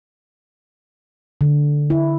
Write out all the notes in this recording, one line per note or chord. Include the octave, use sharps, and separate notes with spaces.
D3
E4